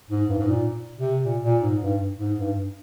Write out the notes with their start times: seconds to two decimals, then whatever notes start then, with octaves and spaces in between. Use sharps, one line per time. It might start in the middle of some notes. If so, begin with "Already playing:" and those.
0.10 G#2
0.29 G2
0.38 G#2
0.47 A#2
0.98 C3
1.24 A#2
1.43 A#2
1.62 G#2
1.82 G2
2.19 G#2
2.39 G2